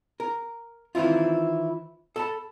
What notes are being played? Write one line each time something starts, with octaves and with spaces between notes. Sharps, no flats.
A#4
D#3 E3 C4 E4 F4
A4 A5 B5